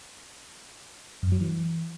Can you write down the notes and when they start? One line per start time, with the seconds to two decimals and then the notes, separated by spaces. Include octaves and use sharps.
1.23 F#2
1.32 F#3
1.41 E3